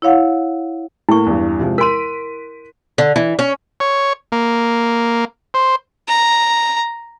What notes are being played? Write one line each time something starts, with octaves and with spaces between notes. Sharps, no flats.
E4 C#5 F5 F#5
A2 A#3 E4 C#6
E2 G2
C3 F3 G#3
A#4 C6 B6 D7 D#7
D3
E3
C#4
C#5
A#3
C5
A#5